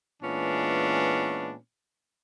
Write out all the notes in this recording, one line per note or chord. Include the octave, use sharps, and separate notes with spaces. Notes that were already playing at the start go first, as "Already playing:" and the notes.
A#2 E3 G#3 B3 C#4 D4